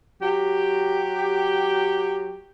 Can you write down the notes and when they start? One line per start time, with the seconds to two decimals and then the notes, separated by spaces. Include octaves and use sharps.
0.21 F#3 G4